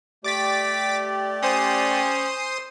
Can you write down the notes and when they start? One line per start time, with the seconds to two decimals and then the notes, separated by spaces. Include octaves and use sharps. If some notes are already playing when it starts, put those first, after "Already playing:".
0.24 A3 G4 D5 D6 A6 B6
1.43 C#4 C5 C6 D#6